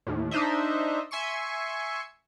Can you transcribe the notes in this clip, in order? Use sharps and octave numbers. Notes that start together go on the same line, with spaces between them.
D#2 A2
D4 D#4 C5 D#5 E5
E5 G#5 C6 C#6 C#7